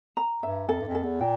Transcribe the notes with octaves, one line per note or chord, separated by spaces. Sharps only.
A#5
G2 E5
F2 A4
G2
F2
A4
E2
A#2 G5